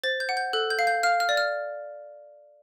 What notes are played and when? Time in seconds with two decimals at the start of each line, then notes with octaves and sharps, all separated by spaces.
0.04 C5 A6
0.20 G6
0.29 F#5
0.37 G6
0.53 A4 F#6
0.70 G6
0.79 F5
0.87 G6
1.03 F5 F6
1.20 F6
1.29 D5
1.37 F6